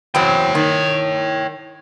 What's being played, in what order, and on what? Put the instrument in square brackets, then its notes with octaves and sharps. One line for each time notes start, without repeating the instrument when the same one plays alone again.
[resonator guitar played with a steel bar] E2 F#3 C4 [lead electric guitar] C#5 G5
[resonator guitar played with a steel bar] D#3